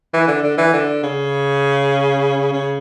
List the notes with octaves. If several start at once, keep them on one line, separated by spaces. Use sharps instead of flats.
E3
D3
D3
E3
D3
C#3
C#3